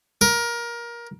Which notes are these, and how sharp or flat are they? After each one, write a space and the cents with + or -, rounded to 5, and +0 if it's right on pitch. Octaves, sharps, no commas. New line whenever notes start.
A#4 +20